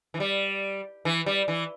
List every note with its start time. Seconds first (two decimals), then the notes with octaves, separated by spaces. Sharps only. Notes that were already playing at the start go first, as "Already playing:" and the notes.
0.14 E3
0.20 G3
1.05 E3
1.26 G3
1.48 E3